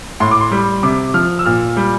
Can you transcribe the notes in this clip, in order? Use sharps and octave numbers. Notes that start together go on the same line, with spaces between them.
A2 C6
D6
C6
G3
C3 D6
F3 F6
E6
A#2 F6
G3